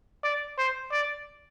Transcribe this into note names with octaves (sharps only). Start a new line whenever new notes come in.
D5
C5
D5